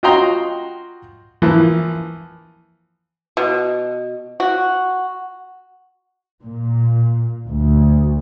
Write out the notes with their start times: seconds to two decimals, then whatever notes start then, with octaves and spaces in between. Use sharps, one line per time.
0.03 F4 F#4 D#5 G5 A#5 C6
1.42 E3 F3 A#3
3.37 B2
4.40 F#4
6.43 A#2
7.48 D2